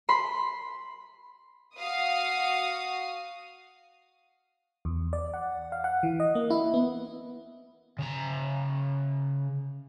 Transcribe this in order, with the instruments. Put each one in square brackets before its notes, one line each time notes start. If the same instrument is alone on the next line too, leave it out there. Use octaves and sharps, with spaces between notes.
[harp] B5 C6
[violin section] F#4 F5 D#6
[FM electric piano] E2
D5
F#5
F5
F#5
E3
D#5
A#3
E4
B3
[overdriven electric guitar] C#3 A#5